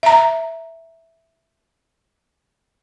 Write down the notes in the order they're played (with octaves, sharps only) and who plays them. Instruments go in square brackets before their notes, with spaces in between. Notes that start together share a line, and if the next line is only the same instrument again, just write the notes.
[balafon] E5 A#5